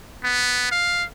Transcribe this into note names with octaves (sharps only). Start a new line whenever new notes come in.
B3
F5